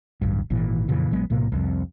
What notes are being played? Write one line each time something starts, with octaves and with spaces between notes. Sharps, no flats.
D1 A1 G2
G#1 A#2 E3
F2 A#2 C#3 E3
A#1 F#3 G#3 B3
B1 A2 C3 A#3
C2 F2